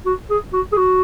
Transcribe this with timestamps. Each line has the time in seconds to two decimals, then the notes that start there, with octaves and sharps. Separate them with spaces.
0.06 F#4
0.30 G#4
0.53 F#4
0.72 G#4
0.77 F#4